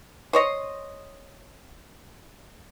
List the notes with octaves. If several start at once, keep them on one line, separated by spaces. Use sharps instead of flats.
C5 C#5 D#5